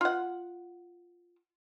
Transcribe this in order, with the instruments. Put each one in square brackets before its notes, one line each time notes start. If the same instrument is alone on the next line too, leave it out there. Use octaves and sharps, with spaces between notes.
[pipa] F4 F#5